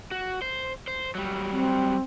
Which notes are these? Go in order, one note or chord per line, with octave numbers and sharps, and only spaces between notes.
F#4
C5
C5
F#3 G3
C4